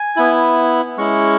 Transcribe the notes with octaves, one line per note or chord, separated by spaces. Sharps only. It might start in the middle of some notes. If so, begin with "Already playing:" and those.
Already playing: G#5
B3 E4
G#3 C#4 E4 C#6